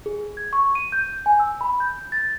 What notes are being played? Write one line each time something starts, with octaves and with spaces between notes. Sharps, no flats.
G#4
G#6
C#6
D#7
G6
G#5
E6
B5
G6
A6